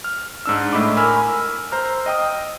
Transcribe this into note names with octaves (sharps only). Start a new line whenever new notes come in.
F6
G#2 D4 E6
A2 A3 D#5 B5 D6
A#4 G#5 B5 E6 F6
C5 A#5 F6
D#5 G5 D#6